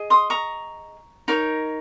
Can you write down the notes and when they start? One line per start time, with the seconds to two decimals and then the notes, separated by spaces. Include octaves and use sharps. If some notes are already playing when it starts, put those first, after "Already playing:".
Already playing: G#4 D#5
0.10 C6 D#6
0.30 A#5 C#6
1.28 D#4 A#4 C#5